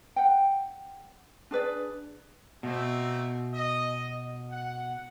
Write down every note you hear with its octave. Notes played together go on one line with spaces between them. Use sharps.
F#5 G5
D4 G#4 B4 D5
B2 A3 A#3 C4
D#5
F#5